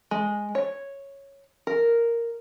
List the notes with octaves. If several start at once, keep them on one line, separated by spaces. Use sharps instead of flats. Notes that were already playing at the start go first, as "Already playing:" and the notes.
G#3
C#5
A#4